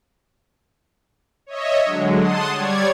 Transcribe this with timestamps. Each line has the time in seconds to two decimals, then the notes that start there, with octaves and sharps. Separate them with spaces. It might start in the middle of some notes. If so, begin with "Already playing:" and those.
1.46 C#5 D#5 E5
1.85 D3 F#3 G#3
2.19 F#5 A5 C6 D#6
2.52 G3 C#5 D5 G#6